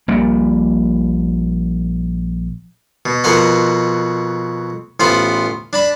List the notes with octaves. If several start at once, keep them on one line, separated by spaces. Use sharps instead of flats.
A#1 A#2 G3
B2
F2 B2 A#4 F#5 C6
A1 B3 F4 C5 B5 C6
D4 A5 B5